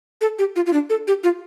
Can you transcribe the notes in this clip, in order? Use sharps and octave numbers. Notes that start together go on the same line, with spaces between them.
A4
G4
F4
F4
D4
A4
G4
F4